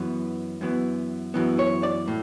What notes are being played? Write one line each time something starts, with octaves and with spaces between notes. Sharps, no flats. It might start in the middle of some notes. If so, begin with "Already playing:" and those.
Already playing: F#2 E3 B3
F#2 E3 B3
F#2 E3 B3
C#5
D5
A2